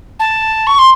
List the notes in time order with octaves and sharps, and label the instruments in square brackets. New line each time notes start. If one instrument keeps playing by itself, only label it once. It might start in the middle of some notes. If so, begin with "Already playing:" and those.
[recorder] A5
C#6
C6